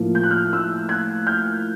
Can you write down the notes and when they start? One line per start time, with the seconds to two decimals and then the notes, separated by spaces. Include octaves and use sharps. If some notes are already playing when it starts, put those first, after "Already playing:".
Already playing: A2 F3 A#3
0.15 G6
0.23 F#6
0.31 F6 G6
0.53 E6 F#6
0.89 F#6 G#6
1.27 F6 G6